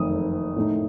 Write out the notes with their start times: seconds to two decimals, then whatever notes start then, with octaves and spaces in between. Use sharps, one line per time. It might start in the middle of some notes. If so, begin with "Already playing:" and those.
Already playing: F#1 F2 D#3 A3 D#6
0.56 A2 A3 D#4